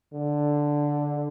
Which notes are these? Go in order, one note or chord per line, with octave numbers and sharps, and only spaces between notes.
D3